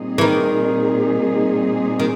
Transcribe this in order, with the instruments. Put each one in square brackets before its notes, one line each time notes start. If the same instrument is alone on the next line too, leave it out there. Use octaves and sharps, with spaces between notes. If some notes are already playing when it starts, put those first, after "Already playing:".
Already playing: [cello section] A#2 G3 C4 D#4 G#4
[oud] E3
D#3
D#3